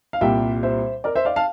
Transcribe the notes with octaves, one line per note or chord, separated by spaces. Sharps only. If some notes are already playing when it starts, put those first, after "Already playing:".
F5
C2 A#2 G3 E5 G5
C5 E5
A#4 D5
C5 E5
D5 F5
F5 A5